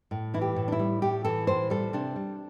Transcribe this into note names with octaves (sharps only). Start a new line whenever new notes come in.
A2
E3 E4
G4
A2
D4
E4
G3
A2 G4
E3 A4
A2 C5
G3 A4
C3 D4
G3